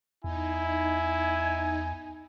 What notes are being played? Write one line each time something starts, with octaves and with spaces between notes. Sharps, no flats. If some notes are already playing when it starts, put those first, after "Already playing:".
E2 D#4 E4 G#5